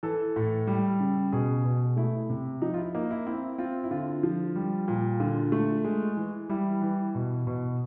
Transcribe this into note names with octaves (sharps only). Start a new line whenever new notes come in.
E3 A4
A2
G3
C#3
B2 G#4
B2
A3 E4
C3
F3 D#4
F4
E4
A#3 D#4
E4
C4 E4
C4 F4
E4
D3 F4
F3
G3
A#2
D3 F4
A3
G#3
E3
G3 E4
E3
B2
B2